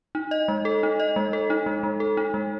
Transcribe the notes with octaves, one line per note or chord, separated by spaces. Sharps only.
D#4
D#5
G#3
A4
D#4
D#5
G#3
A4
D#4
G#3
G#3
A4
D#4
G#3